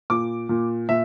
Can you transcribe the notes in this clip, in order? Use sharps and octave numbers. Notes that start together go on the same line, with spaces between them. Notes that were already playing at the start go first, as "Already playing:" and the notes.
A#2 D6
A#2
A#2 E5